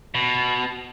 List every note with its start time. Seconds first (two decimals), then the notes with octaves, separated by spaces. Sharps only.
0.15 B2